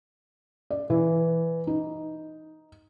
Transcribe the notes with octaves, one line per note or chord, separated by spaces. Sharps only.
D5
E3
D#4